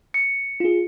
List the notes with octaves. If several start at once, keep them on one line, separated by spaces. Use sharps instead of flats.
C#7
F4 G#4